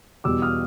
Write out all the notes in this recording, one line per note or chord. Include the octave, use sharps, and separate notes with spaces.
E2 B2 G3 D6 E6
D#6 F6